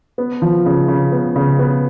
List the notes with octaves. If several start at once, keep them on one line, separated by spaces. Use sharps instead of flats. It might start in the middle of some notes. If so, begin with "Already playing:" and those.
B3
F3
C#3
C#3
B3
C#3
B3